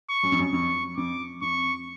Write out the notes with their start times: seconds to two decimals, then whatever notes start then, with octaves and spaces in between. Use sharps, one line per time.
0.09 C#6
0.23 F#2
0.32 F2
0.39 F#2
0.53 F2 C#6
0.97 F2 D6
1.41 F2 C#6